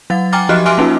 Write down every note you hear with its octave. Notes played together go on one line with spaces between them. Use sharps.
F#3 F#5 A6
G5 G#5 A#5 D6 F6 A6
F3 F#4 G4 D#5 F6 F#6
E5 G#5 C6 D6 F6 D7
A#3 C#4 D#4 F4